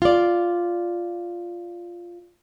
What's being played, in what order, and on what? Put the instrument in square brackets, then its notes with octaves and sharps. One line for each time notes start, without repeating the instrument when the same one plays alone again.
[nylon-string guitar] F4 D5